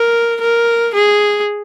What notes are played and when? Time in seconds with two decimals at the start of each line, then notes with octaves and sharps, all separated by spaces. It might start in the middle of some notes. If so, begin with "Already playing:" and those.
Already playing: A#4
0.41 A#4
0.94 G#4